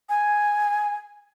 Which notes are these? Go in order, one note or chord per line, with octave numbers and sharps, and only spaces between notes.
G#5